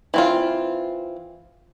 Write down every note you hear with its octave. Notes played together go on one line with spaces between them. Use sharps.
E3 C4 F4